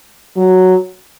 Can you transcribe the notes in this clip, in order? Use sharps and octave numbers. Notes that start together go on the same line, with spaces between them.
F#3